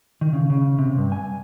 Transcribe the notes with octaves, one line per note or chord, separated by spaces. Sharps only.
D#3
C#3
C#3
C3
G2
G#5